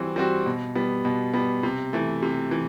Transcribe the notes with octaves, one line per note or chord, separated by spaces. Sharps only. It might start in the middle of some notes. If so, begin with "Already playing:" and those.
Already playing: E3 G3 C4 F#4
G3 C4 F#4
B2
G3 B3
B2
G3 B3
C3
E3 A3
C3
E3